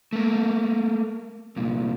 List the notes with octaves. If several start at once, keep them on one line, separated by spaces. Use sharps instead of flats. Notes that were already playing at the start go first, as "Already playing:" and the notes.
A3 A#3
C2 A#2